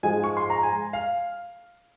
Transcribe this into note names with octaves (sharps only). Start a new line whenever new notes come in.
G#2 F3 G#3 G#5
C#6
C6
A#5
G#5
F5